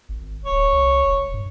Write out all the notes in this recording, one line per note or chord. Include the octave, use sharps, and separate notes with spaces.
G#1
D1 C#5
C2
E1
G2